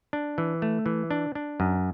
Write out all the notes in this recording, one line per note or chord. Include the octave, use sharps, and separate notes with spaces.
D4
E3
A3
E3
D4
D4
F#2